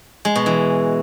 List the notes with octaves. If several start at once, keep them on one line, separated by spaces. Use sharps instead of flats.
G#3
B2
E3